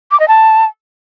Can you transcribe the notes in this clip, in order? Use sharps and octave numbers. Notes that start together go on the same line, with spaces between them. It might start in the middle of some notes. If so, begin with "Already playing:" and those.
D6
D#5
A5